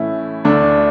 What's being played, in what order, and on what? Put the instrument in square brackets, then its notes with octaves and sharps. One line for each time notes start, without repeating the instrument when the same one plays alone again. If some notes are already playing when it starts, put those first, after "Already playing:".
Already playing: [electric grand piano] A2 E3 A3 C#4 [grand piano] E4
[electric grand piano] D2 D3 A3 [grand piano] D4